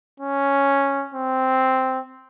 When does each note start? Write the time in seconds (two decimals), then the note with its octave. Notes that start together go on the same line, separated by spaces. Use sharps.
0.20 C#4
1.15 C4